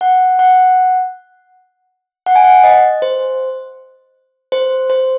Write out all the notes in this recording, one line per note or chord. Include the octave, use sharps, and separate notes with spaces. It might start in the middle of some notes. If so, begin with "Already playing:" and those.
F#5
F#5
F#5
G#5
F#5
D#5
C5
C5
C5